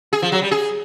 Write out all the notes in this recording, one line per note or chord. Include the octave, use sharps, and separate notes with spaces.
G#4
F3
F#3
G3
G#4